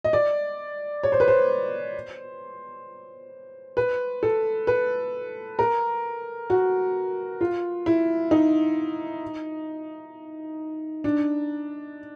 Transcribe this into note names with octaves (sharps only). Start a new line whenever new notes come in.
D#5
D5
C#5
C5
B4
C5
B4
A4
B4
A#4
F#4
F4
E4
D#4
D4